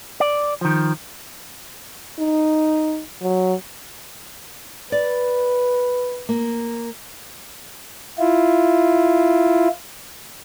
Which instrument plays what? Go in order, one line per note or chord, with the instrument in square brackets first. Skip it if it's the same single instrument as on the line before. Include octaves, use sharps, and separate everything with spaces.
[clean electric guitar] D5
D#3 F3
[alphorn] D#4
F#3
[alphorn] B4 [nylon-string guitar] D5
[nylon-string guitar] A#3
[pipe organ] E4 F4